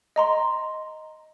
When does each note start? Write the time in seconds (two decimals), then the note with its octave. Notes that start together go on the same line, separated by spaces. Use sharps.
0.16 D#5 A#5 C6